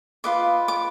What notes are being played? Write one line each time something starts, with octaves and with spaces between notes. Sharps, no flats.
F4 B4 D#5 D6
D6